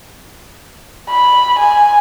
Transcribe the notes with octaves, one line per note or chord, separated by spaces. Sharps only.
B5
G#5